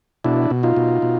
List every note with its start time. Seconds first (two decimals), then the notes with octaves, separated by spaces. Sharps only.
0.24 B2 D4 E4
0.51 B2
0.63 D#4 F4
0.76 B2
1.02 B2